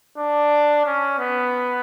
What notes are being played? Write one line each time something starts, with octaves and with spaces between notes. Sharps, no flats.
D4
C#4
B3